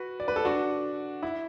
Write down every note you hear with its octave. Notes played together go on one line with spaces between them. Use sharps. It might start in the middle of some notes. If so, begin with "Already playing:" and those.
Already playing: F#4 B4
D5
B4
A4
D4 F#4
E4